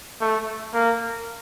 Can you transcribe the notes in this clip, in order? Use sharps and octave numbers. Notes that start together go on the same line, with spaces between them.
A3
A#3